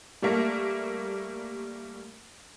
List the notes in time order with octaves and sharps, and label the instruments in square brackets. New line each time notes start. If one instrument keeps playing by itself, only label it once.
[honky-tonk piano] G3 A3 A#3